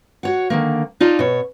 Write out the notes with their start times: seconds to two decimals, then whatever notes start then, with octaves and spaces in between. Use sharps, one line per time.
0.23 F#4 C#5 F#5
0.50 D3 D#3 A#3
1.00 D#4 F4 D5 A5
1.19 B2 C#5